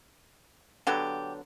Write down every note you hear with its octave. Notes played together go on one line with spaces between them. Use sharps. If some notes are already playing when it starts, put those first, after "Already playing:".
D3 F#3 B3 G4